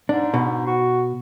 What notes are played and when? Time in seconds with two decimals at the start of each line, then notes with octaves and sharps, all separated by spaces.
0.09 G#2 D4
0.34 B2
0.67 F#4